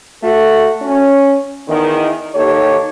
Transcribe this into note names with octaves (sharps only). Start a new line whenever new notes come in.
A3 F#4 A4
C#4
E2 D#3
D#2 D#4 G4 A4 C#5